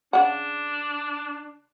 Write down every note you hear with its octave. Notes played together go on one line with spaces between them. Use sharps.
C#3 D4 F#5